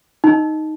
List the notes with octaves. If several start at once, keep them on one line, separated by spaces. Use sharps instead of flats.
D#4